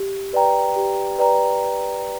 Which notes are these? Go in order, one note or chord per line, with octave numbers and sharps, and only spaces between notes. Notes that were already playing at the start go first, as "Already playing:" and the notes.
Already playing: G4
B4 D5 G5 A#5
G4
B4 D5 G5 A#5